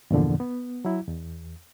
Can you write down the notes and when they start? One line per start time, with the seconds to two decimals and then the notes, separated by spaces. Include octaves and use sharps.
0.11 E2 G2 A#2 D3 F3
0.40 B3
0.85 F#3 E4
1.08 E2